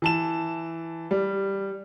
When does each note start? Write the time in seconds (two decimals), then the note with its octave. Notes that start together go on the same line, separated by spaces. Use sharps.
0.02 E3 A5 E7
1.11 G3